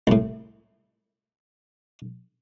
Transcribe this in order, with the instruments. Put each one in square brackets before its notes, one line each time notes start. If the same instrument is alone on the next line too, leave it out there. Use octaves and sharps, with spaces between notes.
[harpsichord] C2 A2